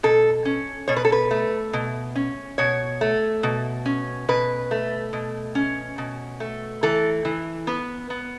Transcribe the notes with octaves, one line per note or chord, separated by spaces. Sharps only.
B2 A4
C#4
B2 C#5
B4
A4
B4
A3
B2
C#4
B2 C#5
A3
B2
C#4
B2 B4
A3
B2
C#4
B2
A3
E3 A4
E3
B3 B4
B3